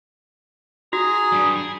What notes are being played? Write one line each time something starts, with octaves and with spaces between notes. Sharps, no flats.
F#4 G#4 A#5
G2 G3
G#4